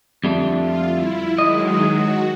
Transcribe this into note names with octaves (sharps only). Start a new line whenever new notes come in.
F2 D3 G3 A3
F4
E4
D#3 F#3 G#3 D#5
F#4